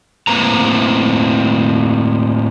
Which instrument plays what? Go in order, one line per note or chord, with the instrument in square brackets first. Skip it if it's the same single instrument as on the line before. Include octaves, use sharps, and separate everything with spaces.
[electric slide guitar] A2 A#3 C4 B4 A#5